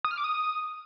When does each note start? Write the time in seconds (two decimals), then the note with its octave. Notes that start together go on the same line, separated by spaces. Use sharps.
0.05 D#6
0.11 F6
0.17 D6
0.24 D#6